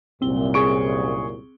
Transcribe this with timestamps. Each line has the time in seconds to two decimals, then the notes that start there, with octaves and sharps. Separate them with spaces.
0.22 C2 F#2 A#2 C4 G7
0.54 G#4 C#6 D7